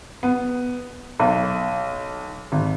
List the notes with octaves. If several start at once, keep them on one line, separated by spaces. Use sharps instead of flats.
B3
B1
G#1